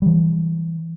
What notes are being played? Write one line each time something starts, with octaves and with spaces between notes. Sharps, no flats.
E3 G3